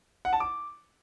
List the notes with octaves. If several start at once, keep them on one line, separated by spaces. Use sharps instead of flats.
F#5
A5
D6